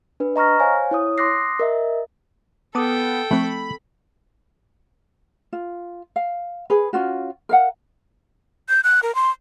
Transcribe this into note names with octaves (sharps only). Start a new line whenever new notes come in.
D4 B4
D#5 A#5 C#6 F6 A#6
C5 C#5 F5 G#5
E4 C#5 D#6
C6 D6 D#6 F#6 A#6 C7
A#4 D#5 E5
B3 A4 G5 A5 D6 D#6
F3 A3 C4 B5 C#6
F4
F5
G#4 B4
C#4 F4 F#4
A#4 F5 F#5
G6
F#6
A#4
C6